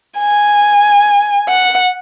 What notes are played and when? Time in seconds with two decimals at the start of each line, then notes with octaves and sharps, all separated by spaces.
0.18 G#5
1.49 F#5